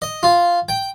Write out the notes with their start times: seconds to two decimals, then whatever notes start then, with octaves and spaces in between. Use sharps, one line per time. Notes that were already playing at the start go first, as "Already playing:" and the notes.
0.02 D#5
0.23 F4
0.69 G5